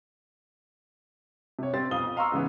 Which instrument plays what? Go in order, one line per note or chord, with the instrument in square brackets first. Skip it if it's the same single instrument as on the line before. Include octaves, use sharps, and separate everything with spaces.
[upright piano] C3 C#5
G3 C4 A6
B1 F2 F5 D#6 G7
F2
D#5 F5 A#5 C6 C#6 E6
G#2 C#3 E3 B3